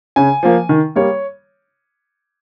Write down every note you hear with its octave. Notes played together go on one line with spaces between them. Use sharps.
C#3 G#5
F3 A#3
D#3
G3 A#3 C#5